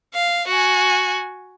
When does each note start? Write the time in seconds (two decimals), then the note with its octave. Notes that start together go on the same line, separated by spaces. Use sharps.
0.14 F5
0.47 F#4 G#5